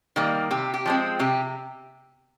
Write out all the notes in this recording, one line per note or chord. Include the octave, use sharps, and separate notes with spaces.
D#3 G3 A#3
C3 G4
G4
F3 G#3 C4
C3 G4